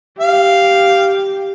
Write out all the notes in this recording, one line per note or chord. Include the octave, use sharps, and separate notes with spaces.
G4 F5